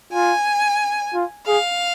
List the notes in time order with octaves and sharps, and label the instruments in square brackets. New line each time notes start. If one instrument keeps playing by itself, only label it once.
[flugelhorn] F4 [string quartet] G#5
[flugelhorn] F4
[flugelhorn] G#4 [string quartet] F5